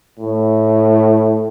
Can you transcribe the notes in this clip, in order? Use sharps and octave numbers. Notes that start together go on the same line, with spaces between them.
A2